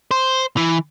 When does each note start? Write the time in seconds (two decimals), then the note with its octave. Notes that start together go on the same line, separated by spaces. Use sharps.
0.11 C5
0.57 E3